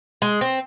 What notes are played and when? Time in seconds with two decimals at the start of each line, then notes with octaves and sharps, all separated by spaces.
0.22 G#3
0.41 C4